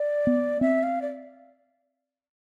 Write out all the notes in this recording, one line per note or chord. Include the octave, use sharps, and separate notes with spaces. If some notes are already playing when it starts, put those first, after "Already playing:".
Already playing: D5
B3
C4 E5
F5
D5